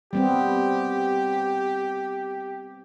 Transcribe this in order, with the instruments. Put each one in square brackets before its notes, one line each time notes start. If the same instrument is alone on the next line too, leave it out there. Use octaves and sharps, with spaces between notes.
[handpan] G3 B3 C4 [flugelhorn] G4